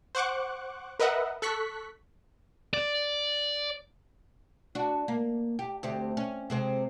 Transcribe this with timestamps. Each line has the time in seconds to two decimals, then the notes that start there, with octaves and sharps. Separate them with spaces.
0.15 C5 F#5 C#6 D6 F#6
0.99 A#4 B4 D#5 E5 F#5
1.42 A4 C#6 F#6 B6
2.73 D5
4.75 D4 F#4
5.08 A#3
5.59 G4
5.83 D2 C4 G4
6.17 C#4
6.50 C3 G#3 C4